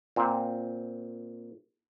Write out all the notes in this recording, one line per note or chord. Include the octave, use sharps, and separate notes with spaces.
A#2 C4